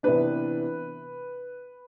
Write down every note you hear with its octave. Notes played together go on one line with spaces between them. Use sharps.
C3 E3 B3 D4 B4